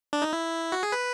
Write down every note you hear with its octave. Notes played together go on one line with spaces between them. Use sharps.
D4
D#4
E4
F#4
G#4
B4